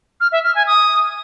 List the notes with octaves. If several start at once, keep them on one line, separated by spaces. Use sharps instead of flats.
F6
E5
F6
G#5
D#6